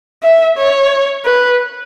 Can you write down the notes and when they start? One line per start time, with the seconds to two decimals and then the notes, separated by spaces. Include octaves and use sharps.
0.23 E5
0.57 C#5
1.25 B4